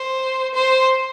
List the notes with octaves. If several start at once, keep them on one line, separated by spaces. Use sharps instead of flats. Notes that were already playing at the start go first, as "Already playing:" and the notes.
Already playing: C5
C5